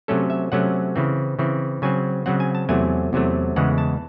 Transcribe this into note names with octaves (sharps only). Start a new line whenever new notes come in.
C3 F#3 A3 C#4 A4
E5
C3 F#3 A3 C#4 F#5
C#3 E3 C4
C#3 E3 C4
C#3 F#3 C4 G#5
C#3 F#3 C4 F#5
G#5
A5
E2 C3 F#3 A3 G#5
E2 C3 F#3 A3
E2 C#3 E3 G#3 F#5
A5